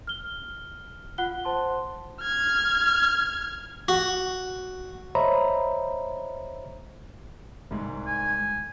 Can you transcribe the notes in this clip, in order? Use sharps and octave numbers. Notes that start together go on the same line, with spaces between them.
F6 G7
F4 F#5 F#6 G7
C5 A5 C6
F6 G#6
F#4
C5 C#5 D#5 E5 A#5 B5
C2 G#2
G#5